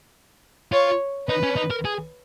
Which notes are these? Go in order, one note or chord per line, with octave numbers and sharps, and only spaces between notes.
F4 C#5
D#4 B4
C#4
D#4
A#4
G#4